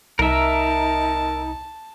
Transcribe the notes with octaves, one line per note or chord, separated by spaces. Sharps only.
C2 D#4 A#4 E5 A5